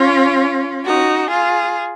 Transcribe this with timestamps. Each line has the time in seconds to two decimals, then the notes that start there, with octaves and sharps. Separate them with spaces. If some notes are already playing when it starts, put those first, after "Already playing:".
Already playing: C#4 F4
0.85 D#4 F#4
1.30 F4 G#4